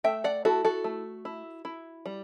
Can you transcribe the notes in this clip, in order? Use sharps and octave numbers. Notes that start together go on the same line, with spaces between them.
A3 E5 G5
D5 F#5
E4 F#4 A4
F#4 A4
A3
E4
E4
G3